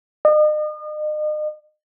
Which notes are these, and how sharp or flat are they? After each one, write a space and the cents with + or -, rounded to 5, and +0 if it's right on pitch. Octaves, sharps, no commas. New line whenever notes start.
D#5 -40